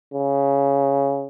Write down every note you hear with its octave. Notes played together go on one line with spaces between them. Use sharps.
C#3